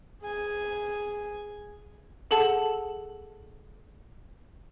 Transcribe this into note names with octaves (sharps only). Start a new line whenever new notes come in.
G#4 G#5
G#4 A4 F#5 A5